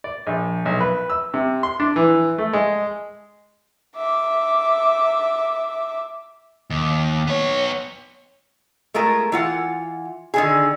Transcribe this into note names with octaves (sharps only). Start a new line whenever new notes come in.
D5
A#1
B1
B4
E6
C3
C6
D4
E3
A3
G#3
E5 D6
D#2
B3 C#5
G#3 A3 F4 A#4
E3 F4 F#5
D3 D#3 G#4